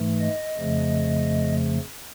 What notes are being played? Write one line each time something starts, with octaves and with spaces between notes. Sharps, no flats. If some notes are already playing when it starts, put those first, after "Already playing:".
Already playing: G#2 E3 A3
D#5
F2 C#3 F3 A3